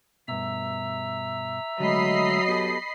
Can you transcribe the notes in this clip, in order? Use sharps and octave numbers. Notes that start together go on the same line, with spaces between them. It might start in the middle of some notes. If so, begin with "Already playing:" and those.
G2 B2 E5 A#5 E6
D3 F#3 G#3 A3 D#5 B5 C7
B3 G4 A4